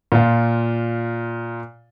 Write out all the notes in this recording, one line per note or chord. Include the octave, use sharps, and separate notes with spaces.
A#2 F4